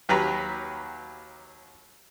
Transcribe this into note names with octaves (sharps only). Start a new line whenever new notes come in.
D#2 F#3 G4 B4 A#5 B5